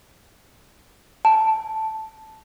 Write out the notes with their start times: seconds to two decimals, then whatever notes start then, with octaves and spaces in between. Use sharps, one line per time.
1.25 A5